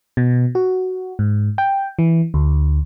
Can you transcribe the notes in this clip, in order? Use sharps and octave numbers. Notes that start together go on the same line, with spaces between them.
B2
F#4
G#2
G5
E3
D2